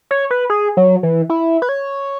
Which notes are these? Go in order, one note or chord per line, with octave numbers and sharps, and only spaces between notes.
C#5
B4
G#4
F#3
E3
E4
B4
C#5